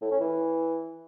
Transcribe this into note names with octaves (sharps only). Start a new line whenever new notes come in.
A2
C#4
E3